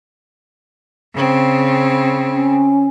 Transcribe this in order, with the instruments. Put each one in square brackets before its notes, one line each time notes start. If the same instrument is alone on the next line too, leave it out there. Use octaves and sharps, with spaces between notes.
[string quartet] C#3 C4
[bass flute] C#4